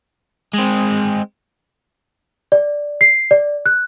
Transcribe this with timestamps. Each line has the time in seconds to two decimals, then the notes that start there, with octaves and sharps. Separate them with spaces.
0.53 G#3 C4
2.52 D5
3.01 C7
3.31 D5
3.66 F#6